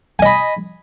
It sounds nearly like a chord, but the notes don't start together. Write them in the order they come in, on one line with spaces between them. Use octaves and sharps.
G#5 D#5 B5